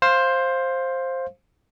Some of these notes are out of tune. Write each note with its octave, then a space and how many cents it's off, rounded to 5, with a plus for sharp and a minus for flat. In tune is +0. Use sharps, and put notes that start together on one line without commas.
C5 +10 F5 +0